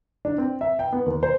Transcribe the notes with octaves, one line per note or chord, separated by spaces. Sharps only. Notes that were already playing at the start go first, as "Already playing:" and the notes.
D4
C4
E5
G5
B3
D#2
C5